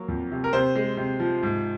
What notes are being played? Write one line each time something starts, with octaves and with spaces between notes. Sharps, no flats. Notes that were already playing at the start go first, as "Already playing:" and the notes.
Already playing: F#3 A#3
F2
C3
A#4
C3 C5
G#3
C3
F3
G#2